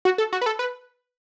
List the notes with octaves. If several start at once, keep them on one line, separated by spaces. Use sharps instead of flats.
F#4
A4
F#4
B4
A4
B4